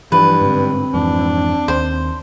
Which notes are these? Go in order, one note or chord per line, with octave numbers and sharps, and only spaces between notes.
G2 E3 F3 B4
G#2 D3 C4
F2 G#2 E3 D4
D#2 C5